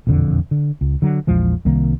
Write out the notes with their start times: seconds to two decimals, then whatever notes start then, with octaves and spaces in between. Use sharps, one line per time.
0.07 E1 A#1 F2 D3
0.51 D3
0.81 C#2
1.02 D3 F#3
1.27 A#1 E2 F3 G#3
1.65 C2 D#3 G3 A#3